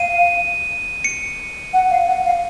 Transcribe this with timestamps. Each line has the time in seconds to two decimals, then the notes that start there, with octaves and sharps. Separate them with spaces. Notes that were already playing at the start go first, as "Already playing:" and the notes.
Already playing: F5 D#7
1.04 C#7
1.73 F#5
1.91 F5
2.08 F#5
2.25 F5